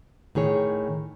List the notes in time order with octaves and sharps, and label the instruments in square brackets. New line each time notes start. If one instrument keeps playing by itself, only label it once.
[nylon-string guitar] A2 D#3 G#4 C#5